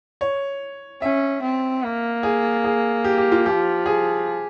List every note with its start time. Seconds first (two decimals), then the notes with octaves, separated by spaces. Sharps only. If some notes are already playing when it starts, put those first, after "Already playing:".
0.21 C#5
1.02 C#4 E5
1.42 C4
1.83 A#3
2.23 G#4
2.64 G#4
3.04 G4
3.18 G4
3.32 F4
3.45 F3 G4
3.86 G#4